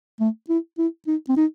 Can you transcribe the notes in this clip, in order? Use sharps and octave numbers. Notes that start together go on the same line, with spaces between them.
A3
E4
E4
D#4
C4
D#4